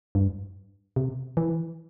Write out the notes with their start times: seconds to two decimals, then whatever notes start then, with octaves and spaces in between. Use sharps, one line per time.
0.15 G2
0.96 C3
1.37 E3